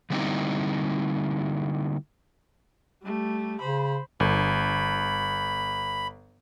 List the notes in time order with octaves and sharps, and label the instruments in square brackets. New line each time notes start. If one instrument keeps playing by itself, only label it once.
[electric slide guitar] D3 G3 A#3 C4 D#4 E4
[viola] G3 A3
[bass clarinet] C#3 [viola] C5 B5
[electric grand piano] G1 [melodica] B5